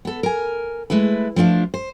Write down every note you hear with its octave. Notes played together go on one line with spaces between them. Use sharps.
B3 A4
A#4 G#5
G#3 A3 E4 B4
F3 A3 D4 F4
C5